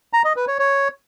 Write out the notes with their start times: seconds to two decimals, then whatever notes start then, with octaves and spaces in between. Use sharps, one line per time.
0.13 A#5
0.25 D#5
0.36 B4
0.48 C#5
0.59 C#5